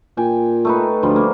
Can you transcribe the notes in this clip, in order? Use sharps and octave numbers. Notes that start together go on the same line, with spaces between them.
A#2 G5 G#5
A3 D#4 B4
D2 F3 G3
A#3